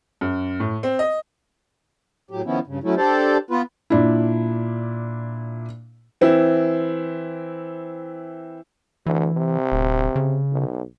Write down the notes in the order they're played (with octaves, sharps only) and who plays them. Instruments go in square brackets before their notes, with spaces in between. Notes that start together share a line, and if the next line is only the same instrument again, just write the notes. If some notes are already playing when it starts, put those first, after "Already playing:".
[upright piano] F#2
A2
C4
D#5
[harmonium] A2 F#3 G4
D#3 F3 B3 C#4 E4
G2 C#3
F#3 A3 C#4 E4
D4 G4 A4 C5 D5
B3 F4 B4
[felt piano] A#2 D4 E4
[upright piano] E3 C4 E4
[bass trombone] D2 [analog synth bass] E3
[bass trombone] C3
[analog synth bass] D1
C#3
[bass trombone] B1